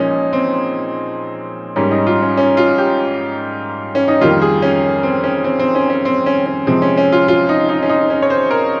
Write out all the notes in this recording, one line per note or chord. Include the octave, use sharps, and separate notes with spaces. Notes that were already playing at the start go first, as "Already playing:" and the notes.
Already playing: A#2 F3 G#3 C#4 D#4
C4
G#2 G3 A#3 C#4
D#4
F4
C#4
C#4
F4
G4
C#4
D#4
F2 D#3 G3 A#3 F4
G#4
C#4
C4
C#4
C4
C4
C#4
C#4
C4
C#4
C#4
C3 F3 G#3 C4
C#4
C#4
F4
F4
D#4
D#4
C#4
D#4
C#4
C#5
C5
A#4